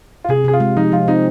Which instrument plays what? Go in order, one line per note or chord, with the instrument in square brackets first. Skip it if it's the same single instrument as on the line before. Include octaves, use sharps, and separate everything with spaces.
[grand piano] F4
[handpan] C3 [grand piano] G#4
[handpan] C3 [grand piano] G#4
[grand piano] F4
[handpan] G#3
[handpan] F3 [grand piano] D#4
[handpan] F3 [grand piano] F4
[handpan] C4 [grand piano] D#4